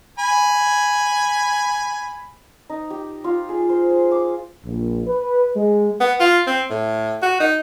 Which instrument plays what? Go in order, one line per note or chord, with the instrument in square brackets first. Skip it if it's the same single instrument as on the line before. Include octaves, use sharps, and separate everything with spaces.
[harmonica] G#5 B5
[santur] D#4
G4
F4
G#4
C5
G#4
D6
[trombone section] A#1
B4
G#3
[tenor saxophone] B3
F4
C4
A2
F#4
D#4